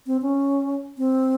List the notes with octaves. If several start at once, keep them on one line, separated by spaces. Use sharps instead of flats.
C4
C#4
C4